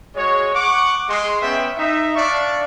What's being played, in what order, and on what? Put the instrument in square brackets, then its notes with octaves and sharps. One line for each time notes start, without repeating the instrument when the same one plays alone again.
[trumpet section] G#3 F#4 C#5
F#5 C#6 D6
G#3 D#5 C6
B3 C#4 E5 G5
D#4 E5
D4 D5 E5 F5 C#6